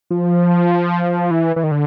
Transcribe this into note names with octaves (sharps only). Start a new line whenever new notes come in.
F3
E3
E3
D#3
D3